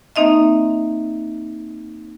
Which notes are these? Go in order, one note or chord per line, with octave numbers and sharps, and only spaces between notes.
A#3 C4 D#4 D#5 E5